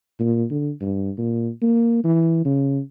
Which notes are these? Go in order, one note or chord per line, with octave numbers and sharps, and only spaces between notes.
A#2
D3
G2
A#2
A#3
E3
C#3